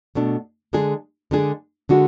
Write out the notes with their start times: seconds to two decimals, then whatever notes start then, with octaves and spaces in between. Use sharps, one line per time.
0.15 B2 A3 D4
0.73 D3 G#3 D4 G#4
1.31 D3 G#3 D4 G#4
1.89 D3 G#3 D4 F#4